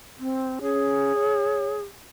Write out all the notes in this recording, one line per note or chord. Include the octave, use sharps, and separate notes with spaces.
C4
C#4 G#4
C#5